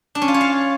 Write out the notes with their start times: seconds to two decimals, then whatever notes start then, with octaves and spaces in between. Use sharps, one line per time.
0.15 D4
0.22 C#4
0.28 F4
0.34 C#5
0.41 F5